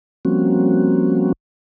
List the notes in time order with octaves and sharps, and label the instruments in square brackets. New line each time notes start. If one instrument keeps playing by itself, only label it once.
[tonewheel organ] F3 G3 A#3 C4 C#4 F#4